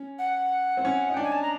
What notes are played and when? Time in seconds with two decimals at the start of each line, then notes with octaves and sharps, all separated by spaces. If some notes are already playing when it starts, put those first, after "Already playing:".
Already playing: C#4
0.19 F#5
0.77 C4
0.85 C#4
1.10 D#4
1.14 D4 G5
1.23 G#5
1.32 A5
1.41 A#5